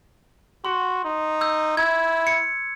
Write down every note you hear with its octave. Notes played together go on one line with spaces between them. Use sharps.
F#4 C6
D#4
E6 G6
E4 G#6
C#7